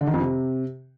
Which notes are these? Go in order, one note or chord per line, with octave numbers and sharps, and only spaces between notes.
D3
D#3
F2
C3